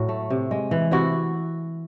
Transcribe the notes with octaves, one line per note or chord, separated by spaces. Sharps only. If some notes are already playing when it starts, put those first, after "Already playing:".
Already playing: A2 F#3 F#4
A3
C3
G#3
E3
C3 E4 F#4